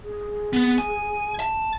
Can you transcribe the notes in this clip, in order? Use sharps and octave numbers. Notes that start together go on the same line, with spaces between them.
G#4
B3
G#5
A5